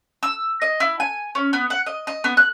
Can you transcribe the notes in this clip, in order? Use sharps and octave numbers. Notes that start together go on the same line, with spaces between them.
E6
D#5
E4
G#5
C#4
B3
F#5
D#5
D#5
B3
F#6